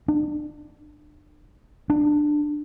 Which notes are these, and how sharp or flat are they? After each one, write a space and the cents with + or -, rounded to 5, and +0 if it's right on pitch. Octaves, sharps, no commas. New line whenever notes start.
D4 +35
D4 +15